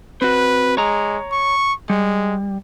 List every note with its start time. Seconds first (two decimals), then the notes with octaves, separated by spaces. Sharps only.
0.22 C4 F#4 B4
0.77 G#3 C#5 A#5
1.32 C#6
1.90 G3 G#3